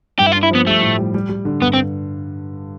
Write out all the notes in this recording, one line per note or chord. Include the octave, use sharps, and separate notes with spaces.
G2 G4
E4
F4
D4
E4
F3 B3
G3 A3
A2
G3
G3
G3
D3
G2 B3
C4